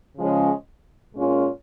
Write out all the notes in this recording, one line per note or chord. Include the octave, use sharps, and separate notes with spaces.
C#3 F3 G#3 C#4
A#2 G#3 C#4 F4